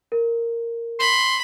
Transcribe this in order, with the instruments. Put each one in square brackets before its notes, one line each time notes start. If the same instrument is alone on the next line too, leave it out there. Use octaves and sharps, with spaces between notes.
[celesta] A#4
[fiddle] B5 [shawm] C6